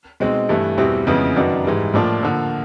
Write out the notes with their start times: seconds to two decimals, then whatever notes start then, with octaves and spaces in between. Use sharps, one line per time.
0.20 B2 G#3 C4 D#4
0.49 G2 E3 A3
0.78 E2 B2 G3 C4 E4
1.07 F2 C#3 E3 G#3 B3
1.36 F#2 D#3 F#3 B3 D4
1.65 G#2 E3 G3
1.94 A2 F3 A#3 D4 F4
2.22 D3 F3 A#3